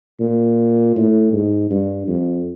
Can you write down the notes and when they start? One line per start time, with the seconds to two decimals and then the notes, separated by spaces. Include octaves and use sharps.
0.20 A#2
0.96 A2
1.33 G#2
1.71 G2
2.08 F2